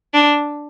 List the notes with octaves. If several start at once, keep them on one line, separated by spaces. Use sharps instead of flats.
D4